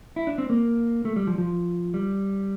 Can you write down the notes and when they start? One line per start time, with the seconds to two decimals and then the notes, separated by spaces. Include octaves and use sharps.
0.16 E4
0.27 D4
0.38 C4
0.50 A#3
1.05 A3
1.16 G3
1.27 F3
1.38 F3
1.94 G3